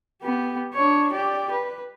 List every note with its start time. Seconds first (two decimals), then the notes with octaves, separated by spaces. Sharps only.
0.22 B3 G4
0.74 D4 C#5
1.13 G4 D5
1.51 B4